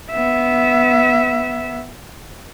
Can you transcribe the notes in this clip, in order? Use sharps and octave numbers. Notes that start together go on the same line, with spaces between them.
B3 E5